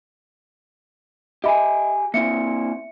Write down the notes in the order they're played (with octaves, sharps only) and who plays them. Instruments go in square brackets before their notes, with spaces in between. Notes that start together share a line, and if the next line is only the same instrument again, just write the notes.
[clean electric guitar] G4 G#5 [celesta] D#5 E5 B5
[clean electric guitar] A#3 C4 E4 [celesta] E5 C#7